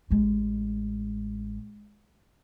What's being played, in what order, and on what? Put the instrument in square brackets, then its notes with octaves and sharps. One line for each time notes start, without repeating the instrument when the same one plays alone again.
[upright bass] A1 G#3